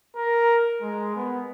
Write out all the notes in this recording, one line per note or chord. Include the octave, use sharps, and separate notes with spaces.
A#4
G#3
B3